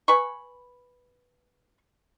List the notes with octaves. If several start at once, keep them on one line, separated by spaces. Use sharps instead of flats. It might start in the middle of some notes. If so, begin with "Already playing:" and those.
B4 G#5 B5 C#6